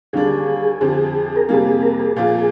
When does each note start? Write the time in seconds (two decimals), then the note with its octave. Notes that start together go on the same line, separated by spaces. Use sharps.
0.13 D#2 D3 G3 D4 G#4
0.81 F2 D3 F3 C4 G4
1.36 A#4
1.49 F2 C3 G3 A#3 G#4
1.66 G#4
1.83 A#4
2.00 G#4
2.16 A#2 F3 A#3 F4 G#4